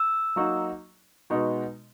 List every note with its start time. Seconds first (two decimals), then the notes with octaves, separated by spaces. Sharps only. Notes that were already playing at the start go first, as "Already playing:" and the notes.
Already playing: E6
0.36 F#3 A#3 D#4 F#4
1.30 B2 G#3 B3 D#4 F#4